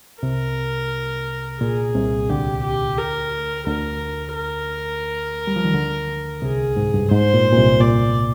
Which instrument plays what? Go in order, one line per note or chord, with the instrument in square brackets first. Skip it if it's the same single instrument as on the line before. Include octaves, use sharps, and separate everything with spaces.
[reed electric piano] C2 C3 [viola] A#4
[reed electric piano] A#2 [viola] G#4
[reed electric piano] C2 C3
[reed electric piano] D2 D3 [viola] G4
[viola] G4
A#4
[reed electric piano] D2 D3 [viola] A#4
[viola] A#4
[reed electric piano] G3
F3
D#3
D2 D3
[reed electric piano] C2 C3 [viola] G#4
[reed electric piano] G#2
G2
[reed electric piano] G#2 [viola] C5
[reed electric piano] A#2
A#2
C2 C3
[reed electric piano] A#2 [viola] D5